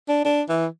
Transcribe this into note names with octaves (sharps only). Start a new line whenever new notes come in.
D4
D4
E3